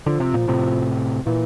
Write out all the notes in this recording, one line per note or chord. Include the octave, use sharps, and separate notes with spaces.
D3 F3
C3
A#2
A2 C3
A#2 E3